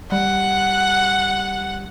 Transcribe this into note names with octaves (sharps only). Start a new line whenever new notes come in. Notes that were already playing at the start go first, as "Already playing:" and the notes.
G3 F#5